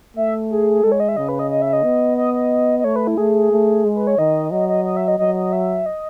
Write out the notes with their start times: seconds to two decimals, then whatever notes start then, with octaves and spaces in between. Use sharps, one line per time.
0.16 A3 E5
0.51 G#4
0.84 G#3 A4
0.92 C#5
1.00 D#5
1.09 E5
1.17 C#3 D#5
1.29 B4
1.39 D#5
1.51 D#5
1.62 E5
1.73 D#5
1.84 B3
2.17 D#5
2.34 D#5
2.79 D#5
2.84 A3 C#5
2.96 B4
3.07 E4
3.17 A3 G#4
3.52 A3
3.85 G#3
3.96 B4
4.07 C#5
4.18 D#3 D#5
4.51 F#3 D#5
4.68 D#5
4.85 D#5
4.97 E5
5.08 D#5
5.19 F#3 D#5
5.35 D#5
5.53 E5
5.86 D#5